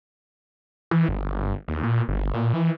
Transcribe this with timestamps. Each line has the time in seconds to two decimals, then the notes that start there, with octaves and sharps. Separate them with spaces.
0.91 E3
1.09 G1
1.68 D#2
1.83 A#2
2.08 G1
2.34 A#2
2.53 E3